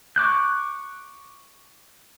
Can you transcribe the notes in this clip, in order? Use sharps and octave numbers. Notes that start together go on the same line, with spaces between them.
C#6 D6 F#6 G6